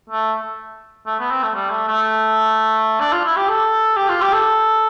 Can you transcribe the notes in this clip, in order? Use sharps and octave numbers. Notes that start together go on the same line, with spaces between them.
A3
A3
B3
C4
A3
G3
A3
A3
D4
F4
E4
G4
A4
G4
F4
G4
A4